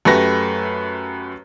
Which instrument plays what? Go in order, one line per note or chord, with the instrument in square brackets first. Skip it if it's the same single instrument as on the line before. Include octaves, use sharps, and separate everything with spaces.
[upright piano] F#2 A3 G4 B4 A#6